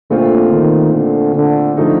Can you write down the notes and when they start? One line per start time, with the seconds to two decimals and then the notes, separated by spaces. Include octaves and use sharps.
0.10 A#2 D3 A3 C4 F4
0.52 D#3
0.94 D3
1.36 D3
1.77 D3 F3 A3 D#4